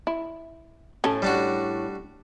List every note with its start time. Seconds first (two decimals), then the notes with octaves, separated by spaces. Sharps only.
0.07 E4
1.04 A2 C#4 A4
1.22 G3 D4 F#4